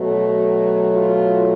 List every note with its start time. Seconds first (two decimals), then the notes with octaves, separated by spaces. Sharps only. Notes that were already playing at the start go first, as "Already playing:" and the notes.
Already playing: B2 F#3 A3
0.92 F4